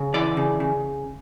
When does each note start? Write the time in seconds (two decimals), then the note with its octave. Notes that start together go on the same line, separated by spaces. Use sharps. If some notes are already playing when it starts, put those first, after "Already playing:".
Already playing: C#3
0.14 E3 D5
0.37 C#3
0.60 C#3